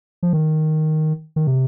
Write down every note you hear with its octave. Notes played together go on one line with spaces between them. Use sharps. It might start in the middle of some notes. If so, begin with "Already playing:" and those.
F3
D#3
D#3
C3